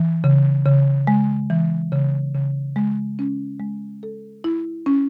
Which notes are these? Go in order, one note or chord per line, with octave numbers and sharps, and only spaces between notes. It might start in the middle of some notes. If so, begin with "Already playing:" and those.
Already playing: E3
C#3
C#3
G#3
E3
C#3
C#3
G#3
C#4
G#3
A4
E4
C#4